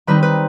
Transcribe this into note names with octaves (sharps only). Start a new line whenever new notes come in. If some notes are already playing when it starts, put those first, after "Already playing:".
D#3 G3 C4 D#4 B4
B4